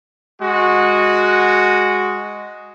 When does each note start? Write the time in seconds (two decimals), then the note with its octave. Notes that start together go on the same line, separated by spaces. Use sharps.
0.42 G#3 F#4